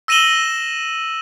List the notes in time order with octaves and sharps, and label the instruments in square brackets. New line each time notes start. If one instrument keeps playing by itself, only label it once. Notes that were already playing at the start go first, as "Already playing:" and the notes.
[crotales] E6 A#6 D#7 E7 F#7 G7